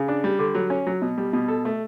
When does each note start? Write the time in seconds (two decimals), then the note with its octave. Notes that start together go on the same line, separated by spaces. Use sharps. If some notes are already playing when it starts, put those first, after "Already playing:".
Already playing: C#3
0.08 D4
0.24 G3
0.39 D3
0.55 F#3
0.70 C#4
0.87 F#3
1.02 B2
1.18 G3
1.33 B2
1.48 A4
1.65 A3